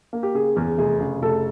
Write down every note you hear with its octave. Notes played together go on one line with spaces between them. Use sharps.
A#3
G4
C#3 G#4
E2 G#4
F1 G#4
C#3 G#4
F1 A4